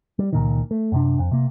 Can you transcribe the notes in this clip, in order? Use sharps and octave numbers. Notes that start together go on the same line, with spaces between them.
G3
C#2 A#2 D#3
A3
F#2 C3 D4
F2
C3 A#3